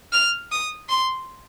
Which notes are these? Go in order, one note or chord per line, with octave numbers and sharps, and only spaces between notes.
F6
D#6
C6